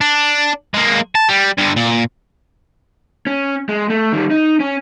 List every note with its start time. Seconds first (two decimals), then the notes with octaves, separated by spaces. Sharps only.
0.01 D4
0.74 G#3 A#3
1.15 A5
1.29 G3
1.58 G2 D3
1.76 A#2
3.27 C#4
3.69 G#3
3.90 A3
4.12 D#3 G3
4.31 D#4
4.60 C#4